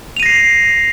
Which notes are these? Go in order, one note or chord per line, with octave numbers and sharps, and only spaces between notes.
A#6 C7 D#7 F7